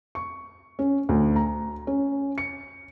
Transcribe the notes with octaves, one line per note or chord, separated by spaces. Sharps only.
C#6
C#4
D2
A#5
C#4
C#7